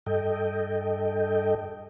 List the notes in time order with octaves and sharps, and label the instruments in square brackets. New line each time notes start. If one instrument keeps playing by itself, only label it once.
[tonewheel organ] G2 A4 D#5 G5